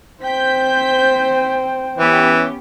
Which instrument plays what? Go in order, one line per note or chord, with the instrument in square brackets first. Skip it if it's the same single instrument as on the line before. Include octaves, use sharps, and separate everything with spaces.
[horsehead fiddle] C4 C5 [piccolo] G5 [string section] G6 B6
[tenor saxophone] E3 [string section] B3 C#4 G4